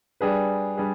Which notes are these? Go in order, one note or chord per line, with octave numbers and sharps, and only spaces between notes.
G3 D4 G#4 B4
G3 D4 G#4 B4